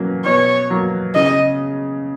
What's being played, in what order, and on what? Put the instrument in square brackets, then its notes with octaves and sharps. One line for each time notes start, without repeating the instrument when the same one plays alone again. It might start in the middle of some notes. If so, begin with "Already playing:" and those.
Already playing: [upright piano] B2 F#3 A#3 C#4
[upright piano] B2 [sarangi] C#5
[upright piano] F#3 A#3
[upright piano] C#3 [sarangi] D#5